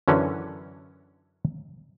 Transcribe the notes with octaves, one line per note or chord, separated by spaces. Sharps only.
F#2 D3 E3 C#4